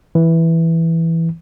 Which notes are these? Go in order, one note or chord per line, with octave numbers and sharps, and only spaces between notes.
E3